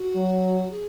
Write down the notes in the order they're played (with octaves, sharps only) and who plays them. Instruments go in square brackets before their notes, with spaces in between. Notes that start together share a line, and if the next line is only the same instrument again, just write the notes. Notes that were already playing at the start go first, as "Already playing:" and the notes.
Already playing: [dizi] F#4
[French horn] F#3
[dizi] G#4